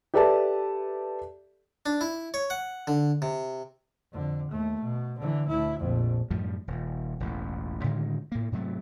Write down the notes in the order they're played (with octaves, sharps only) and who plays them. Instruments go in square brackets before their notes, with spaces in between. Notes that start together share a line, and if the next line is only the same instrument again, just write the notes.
[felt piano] G4 A4 B4 D5 E5 A5
[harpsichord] D4
E4
C#5
F#5
D3
C3
[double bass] F2 D3
D#2 A3
B2
D3 E3
D2 E4
A#1 F2
[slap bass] F#2 A2 F3 G3
D#1
E1 A1 E2
A2 D3 D#3 G#3
A2 A#3
G#2 C3 F#3 A3